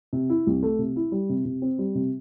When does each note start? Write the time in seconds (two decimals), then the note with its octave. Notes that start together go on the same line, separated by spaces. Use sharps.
0.13 C3
0.30 E4
0.47 C2
0.63 A3
0.79 C3
0.96 E4
1.12 G3
1.29 C3
1.45 C3
1.62 C4
1.79 G3
1.95 C3